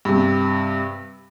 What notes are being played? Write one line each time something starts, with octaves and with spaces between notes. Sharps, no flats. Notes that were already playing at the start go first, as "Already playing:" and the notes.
G2 C3